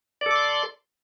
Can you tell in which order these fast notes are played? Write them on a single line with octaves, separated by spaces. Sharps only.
D5 A4 D6 C6